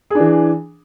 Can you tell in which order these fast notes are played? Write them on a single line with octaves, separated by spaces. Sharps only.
G#4 D4 E3